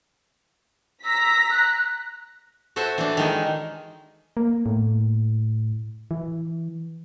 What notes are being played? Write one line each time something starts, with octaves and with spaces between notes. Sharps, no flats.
A#5 E6 A#6 B6
F#6
F#4 A4 B4 C5 E5
E3 D4
D#3 G#3 D#4
A#3
A2
E3